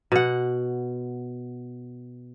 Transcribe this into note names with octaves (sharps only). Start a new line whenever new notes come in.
B2 F#5